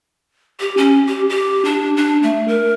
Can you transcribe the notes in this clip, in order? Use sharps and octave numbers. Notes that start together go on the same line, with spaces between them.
G4
C#4
G4
G4
D4
D4
A3
A#4